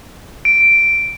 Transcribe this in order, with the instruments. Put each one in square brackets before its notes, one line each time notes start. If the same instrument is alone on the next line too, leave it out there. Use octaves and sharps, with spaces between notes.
[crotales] D7